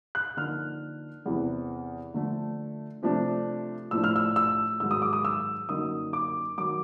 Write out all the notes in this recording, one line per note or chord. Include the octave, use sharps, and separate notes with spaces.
F#6
D3 F3 A#3 D#4 F6
E2 C3 E3
D3 F3 A3
C3 F3 A3 D4
A2 F3 A3 D4 E6
F6
E6
E6
G#2 D#3 F#3 E6
D#6
D6
D#6
E6
F#2 D3 F#3 A#3 D#4 D#6
D6
D#3 F#3 D6